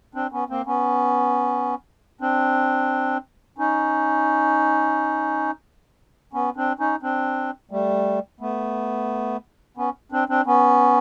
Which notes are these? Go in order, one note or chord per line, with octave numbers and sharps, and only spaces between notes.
C4 D4
B3 C#4
A#3 C4
B3 C#4
C4 D4
C#4 D#4
B3 C#4
C4 D4
C#4 D#4
C4 D4
G3 A3
A3 B3
B3 C#4
C4 D4
C4 D4
B3 C#4